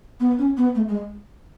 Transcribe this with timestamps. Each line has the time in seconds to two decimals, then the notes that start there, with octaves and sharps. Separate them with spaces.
0.20 B3
0.39 C#4
0.57 B3
0.75 A3
0.88 G#3